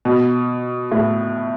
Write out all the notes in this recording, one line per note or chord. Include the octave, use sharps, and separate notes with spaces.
B2
A2